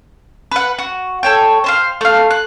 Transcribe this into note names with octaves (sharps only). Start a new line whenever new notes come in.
B4 F#5
F#4
A4 C#5 G5
C5 E5 F5
A3 F5
F#6